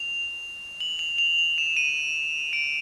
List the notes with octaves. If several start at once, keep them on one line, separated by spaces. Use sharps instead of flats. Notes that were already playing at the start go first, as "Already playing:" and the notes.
Already playing: F7
F#7
F7
F7
F7
E7
D#7
D7